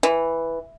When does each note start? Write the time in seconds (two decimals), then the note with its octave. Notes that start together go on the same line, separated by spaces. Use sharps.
0.03 E3